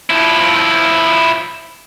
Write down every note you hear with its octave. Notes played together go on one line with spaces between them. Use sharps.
F3 E4